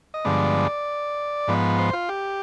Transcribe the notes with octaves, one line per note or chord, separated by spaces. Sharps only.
D#5
G2 D3 F3 G#3 B3 D5
G#2 F3 B3
C5
F4
G4